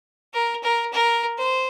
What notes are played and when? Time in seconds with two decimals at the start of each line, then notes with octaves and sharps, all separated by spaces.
0.34 A#4
0.63 A#4
0.93 A#4
1.38 C5